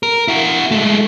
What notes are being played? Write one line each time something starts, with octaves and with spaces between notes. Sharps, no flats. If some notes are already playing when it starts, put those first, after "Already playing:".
A#4
E4 F#4
G#3 A3